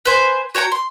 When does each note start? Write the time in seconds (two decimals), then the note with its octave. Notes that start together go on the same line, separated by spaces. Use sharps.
0.05 B4 C5 G#5
0.55 F#4 C#5 G5 A#5
0.72 C6